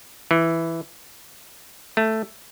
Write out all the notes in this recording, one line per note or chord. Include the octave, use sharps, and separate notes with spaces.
E3
A3